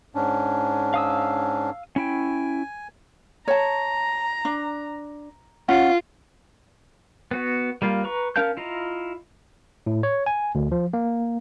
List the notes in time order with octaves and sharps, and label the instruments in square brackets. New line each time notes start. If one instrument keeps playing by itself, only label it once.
[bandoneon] G#2 C#4 D4
[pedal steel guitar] F5 D#6 E6
[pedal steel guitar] C#4 E4 G5 [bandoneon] G#5
[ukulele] C#5 A5 [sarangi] A#5
[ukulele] D4
[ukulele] C#4 F#5 [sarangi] F4
[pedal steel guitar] B3 F#4
G3 A#3 F4
B4 A#5 C#6
C#4 A#4 F5 A5 G6
E4 F4 D#5 A#5
[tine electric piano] A2
C#5
G#5
D2
F3
A#3